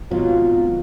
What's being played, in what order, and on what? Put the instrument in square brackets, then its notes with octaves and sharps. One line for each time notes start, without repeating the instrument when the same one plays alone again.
[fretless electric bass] G#1 B2 F#3 [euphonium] F4